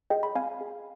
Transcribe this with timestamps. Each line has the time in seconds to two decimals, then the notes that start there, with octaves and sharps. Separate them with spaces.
0.10 G#4 D#5 G5
0.23 B5
0.35 C4 F5 G#5
0.61 G#4